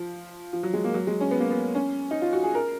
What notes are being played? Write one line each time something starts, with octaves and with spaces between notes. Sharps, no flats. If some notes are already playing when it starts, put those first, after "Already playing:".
Already playing: F3
F3
F#3
G#3
A#3
F#3
G#3
C#4
B3
A#3
B3
C#4
D#4
F4
F#4
G#4
A#4